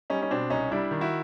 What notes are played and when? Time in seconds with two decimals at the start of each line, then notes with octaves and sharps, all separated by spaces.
0.10 G3 C#4 D#4
0.22 C#4
0.31 B2 C4 D4
0.50 C2 C#4 D#4
0.71 G3 D4 E4
0.91 D#3
1.01 E4 F#4